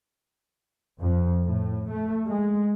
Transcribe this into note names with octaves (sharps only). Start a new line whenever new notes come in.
F2
A2
A3
G#3